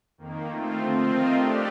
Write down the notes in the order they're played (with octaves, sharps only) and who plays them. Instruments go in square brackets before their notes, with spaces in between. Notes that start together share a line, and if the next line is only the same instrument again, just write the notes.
[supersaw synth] F2 D#3 A#3
A3 C4 F4
D3 F3 C4 F4
A3 C4 F4 A#4 D#5
A3 D4 G4 D5